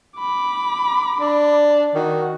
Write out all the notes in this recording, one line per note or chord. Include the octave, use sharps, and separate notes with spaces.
B5 D6
D4
D#3 F#4